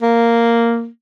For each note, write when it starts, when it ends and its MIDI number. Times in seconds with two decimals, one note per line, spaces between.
0.02 0.87 58